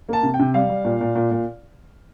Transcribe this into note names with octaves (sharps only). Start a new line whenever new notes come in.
A#3 A5
C3
G5
C3
G3 F5
G3
A#2
A#2
A#2
A#2